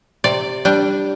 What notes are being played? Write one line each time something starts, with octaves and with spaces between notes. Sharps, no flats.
C3 D5
G3 D4